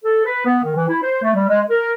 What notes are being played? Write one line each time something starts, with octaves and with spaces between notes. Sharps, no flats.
A4
B4
B3
D#3
E3
E4
C5
A3
G3
G#3
A#4